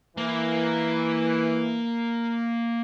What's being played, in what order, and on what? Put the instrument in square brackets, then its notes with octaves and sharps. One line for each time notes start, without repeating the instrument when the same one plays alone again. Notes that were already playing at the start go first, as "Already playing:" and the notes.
[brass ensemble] E3 [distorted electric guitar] A#3